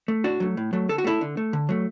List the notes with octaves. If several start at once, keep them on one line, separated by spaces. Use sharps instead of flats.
A3
A2 D4 F#4
F#3 A3
A2
F#3 A3
D3 A4
F#4
A3 E4 A4
D3
A3
D3
F#3 A3